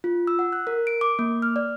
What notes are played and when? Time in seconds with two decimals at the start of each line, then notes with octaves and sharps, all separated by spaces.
0.04 F4
0.27 E6
0.39 F#5
0.53 F#6
0.67 A#4
0.87 D7
1.01 D6
1.19 A#3
1.42 F6
1.56 D5